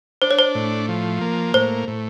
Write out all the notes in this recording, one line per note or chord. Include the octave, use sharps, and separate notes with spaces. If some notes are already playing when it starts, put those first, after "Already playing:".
D4 C5
C#5
C5
A2
F3
A#3
A2 C5
A2